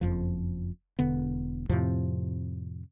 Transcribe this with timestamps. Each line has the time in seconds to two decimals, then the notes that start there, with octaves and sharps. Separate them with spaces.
0.01 F#1 F2 F3
0.99 E1 D3 B3
1.69 F2 A2 C3 F3